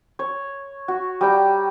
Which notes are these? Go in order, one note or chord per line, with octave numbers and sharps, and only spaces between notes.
C#5
F#4
G3 G5 A#5